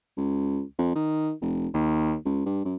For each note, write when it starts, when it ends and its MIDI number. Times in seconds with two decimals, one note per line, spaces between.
0.17 0.61 37
0.78 0.90 41
0.95 1.32 51
1.41 1.68 29
1.74 2.15 39
2.25 2.41 37
2.46 2.64 43
2.65 2.76 42